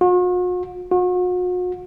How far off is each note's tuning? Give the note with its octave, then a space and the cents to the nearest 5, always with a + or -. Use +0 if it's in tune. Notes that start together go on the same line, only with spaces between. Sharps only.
F#4 -45
F#4 -40